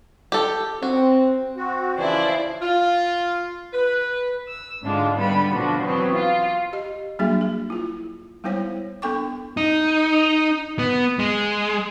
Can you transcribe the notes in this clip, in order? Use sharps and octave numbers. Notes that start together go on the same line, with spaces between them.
G4 A4
C4 F#4
C4 F#4
C#3 E3 F3 E4 C5 D5
F4
B4
E6
G#2 D3 G#3 D4 F4
D3 G3 B3 B5
B2 D3 F3 D4 F#4
E3 F#3 B3 C4
F4
G4 D#5
F#3 G3 A#3 D4 F#4 G#4
G#4
E4 F4
G3 G#3 B3 E4 C5 C#5
B3 D4 A4 G5 C#6 D6
D#4
B3
G#3